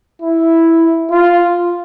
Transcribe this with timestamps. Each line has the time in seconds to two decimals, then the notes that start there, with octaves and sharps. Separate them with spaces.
0.22 E4
1.11 F4